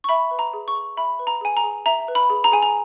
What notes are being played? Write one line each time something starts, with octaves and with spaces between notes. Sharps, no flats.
C#6
E5 B5
B4
A#5
G#4
C#6
G#4
E5 B5
B4
A#5
G#4 G#5
A#5
G#4
E5 A#5
B4
B5
G#4
A#5
G#4 G#5
A#5